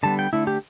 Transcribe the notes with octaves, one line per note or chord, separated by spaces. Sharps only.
D3 G3 B3 A5
G5
D3 A3 E4
G4